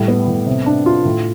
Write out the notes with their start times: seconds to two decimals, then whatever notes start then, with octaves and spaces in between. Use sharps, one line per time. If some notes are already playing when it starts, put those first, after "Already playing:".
Already playing: A2 G3
0.08 B3
0.27 A2
0.46 C3
0.66 D4
0.86 F4
1.05 A2